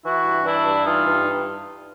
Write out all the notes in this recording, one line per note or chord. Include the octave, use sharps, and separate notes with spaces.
E3 E4 F#4
G2
E3 D4 E4
G2
E3 D#4 F4
G2